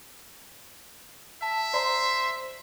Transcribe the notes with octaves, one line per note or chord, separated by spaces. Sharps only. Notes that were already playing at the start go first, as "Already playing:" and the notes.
E5 A5
C5 D5 A#5 C6